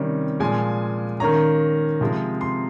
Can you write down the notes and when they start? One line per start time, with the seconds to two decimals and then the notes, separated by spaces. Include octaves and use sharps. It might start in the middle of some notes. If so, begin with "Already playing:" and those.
Already playing: C3 D#3 G3 C#4
0.40 A#2 F3 G#3 G#5
1.20 D#3 A#3 C#4 A#5
2.01 C3 F3 G#3
2.41 C6